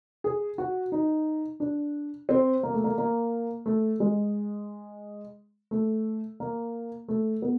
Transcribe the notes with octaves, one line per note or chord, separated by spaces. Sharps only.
G#4
F#4
D#4
D4
C4
A#3
A3
A#3
A#3
A3
G#3
A3
A#3
A3
B3